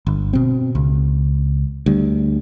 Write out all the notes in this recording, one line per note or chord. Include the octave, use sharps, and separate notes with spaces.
G1
B2 C4
C#2
D2 G3